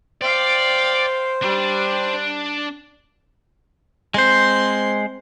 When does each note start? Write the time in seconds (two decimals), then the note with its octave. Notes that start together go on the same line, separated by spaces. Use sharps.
0.21 C5 D5 F5 G5
1.42 G3 D4
4.14 G#3 C4 C5 C6